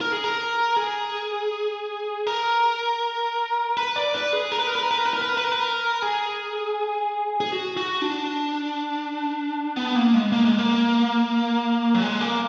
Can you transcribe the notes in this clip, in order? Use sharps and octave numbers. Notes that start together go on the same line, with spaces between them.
A#4
G#4
A#4
G#4
A#4
B4
D5
B4
G#4
A#4
B4
A#4
B4
A#4
B4
A#4
B4
A#4
B4
A#4
B4
A#4
B4
A#4
G#4
G#4
F#4
F#4
D4
B3
A#3
G#3
A#3
G#3
A#3
F#3
G#3
A#3